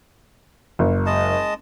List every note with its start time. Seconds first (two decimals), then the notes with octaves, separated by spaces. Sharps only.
0.79 F#1
1.06 G#3 D#5 A5